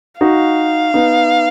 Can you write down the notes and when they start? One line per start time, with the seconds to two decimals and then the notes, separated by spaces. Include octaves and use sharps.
0.21 D#4 F#4 F5
0.94 B3 D#4